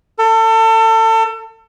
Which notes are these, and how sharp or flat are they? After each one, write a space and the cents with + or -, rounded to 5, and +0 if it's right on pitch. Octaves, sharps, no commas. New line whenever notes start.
A4 +30